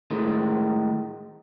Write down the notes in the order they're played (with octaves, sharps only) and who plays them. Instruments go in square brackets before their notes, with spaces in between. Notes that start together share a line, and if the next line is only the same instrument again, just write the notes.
[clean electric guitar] A2 D#3 G#3